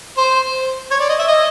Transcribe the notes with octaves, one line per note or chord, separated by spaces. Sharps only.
C5
C#5
D5
D#5
E5
D#5